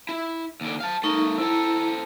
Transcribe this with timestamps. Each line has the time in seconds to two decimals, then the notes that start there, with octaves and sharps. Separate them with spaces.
0.09 E4
0.61 D#2 D3
0.81 F5 A5
1.03 A3 D#4 A#4 C#6
1.38 C4 E4 A4 A#5